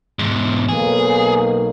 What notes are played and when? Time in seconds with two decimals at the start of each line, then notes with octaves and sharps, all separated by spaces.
0.19 E2 G#2
0.69 B1 A#3 G#4